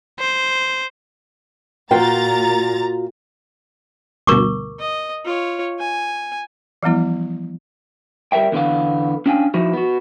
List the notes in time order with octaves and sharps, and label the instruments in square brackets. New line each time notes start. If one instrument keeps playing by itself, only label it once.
[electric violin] C5
[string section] A#2 A#5 A6 [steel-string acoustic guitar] F4 F#4 G5
[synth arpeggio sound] D2 G2 B2 [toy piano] A#4 C#6 D6
[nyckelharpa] D#5
F4 C#5
G#5
[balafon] E3 F3 G3 B3 E4
[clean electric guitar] G3 A#4 C5 E5 G5
E2 D3 B3 F5
C#4 D4 F5 G5 G#5
F3 D#4 E4 F#4
B3 F#4